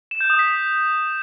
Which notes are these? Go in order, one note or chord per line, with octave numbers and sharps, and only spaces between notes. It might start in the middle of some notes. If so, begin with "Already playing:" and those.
E7
G6
D#6
B6